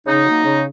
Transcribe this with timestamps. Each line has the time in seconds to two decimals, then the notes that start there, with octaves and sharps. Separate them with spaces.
0.06 C#3 D#4
0.25 F#3 A#3
0.44 C#3